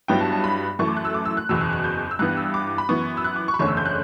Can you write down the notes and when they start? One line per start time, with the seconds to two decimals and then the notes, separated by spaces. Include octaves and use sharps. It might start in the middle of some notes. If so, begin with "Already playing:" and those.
0.08 G2 F#3 B3 E4 G5
0.21 A5
0.32 A5
0.44 B5
0.79 F#2 E3 A3 C#6
0.88 D6
0.97 F#6
1.05 E6
1.14 D6
1.25 E6
1.37 F#6
1.49 F#1 E2 B2 E6
1.61 F#6
1.73 F#6
1.84 G6
2.11 E6
2.19 G2 E3 B3 F#6
2.37 E6
2.54 D6
2.78 B5
2.89 F#2 E3 B3 C#6
3.17 E6
3.24 F#6
3.36 D6
3.48 C#6
3.54 B5
3.59 F#1 E2 D3 A3 C#4 C#6
3.68 E6
3.77 G6
3.86 F#6